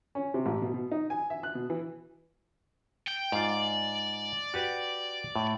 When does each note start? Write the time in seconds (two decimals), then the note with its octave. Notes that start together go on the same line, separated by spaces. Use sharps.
0.15 C#4
0.34 C3
0.46 A1
0.62 B2
0.74 B2
0.92 D#4
1.10 G#5
1.30 E5
1.43 F#6
1.55 B2
1.70 E3
3.07 G5
3.32 G#2 F4 D5
4.54 F#4 G4 B4
5.36 A2